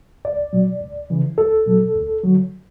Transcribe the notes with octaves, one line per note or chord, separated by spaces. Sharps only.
C#2 D5
B2 F#3
C#2
C#3 E3
C#2 A4
B2 F#3
D2
D3 F#3